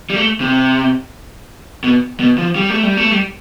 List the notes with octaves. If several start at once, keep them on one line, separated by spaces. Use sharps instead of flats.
G3
A3
C3
B2
B2
F3
G3
A3
G3
A3
G3